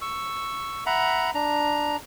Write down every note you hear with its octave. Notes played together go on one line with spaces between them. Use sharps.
C#6 E6
E5 F#5 A#5 B5
D4 A#5